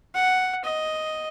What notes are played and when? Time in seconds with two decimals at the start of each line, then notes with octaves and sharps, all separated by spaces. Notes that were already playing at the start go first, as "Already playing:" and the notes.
0.14 F#5
0.64 D#5